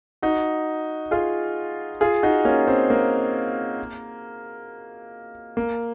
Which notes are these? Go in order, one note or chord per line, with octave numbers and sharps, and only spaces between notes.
D#4 F#4
F4 G#4
F4 G#4
D#4 F#4
A#3 C#4
C4
A#3
A#3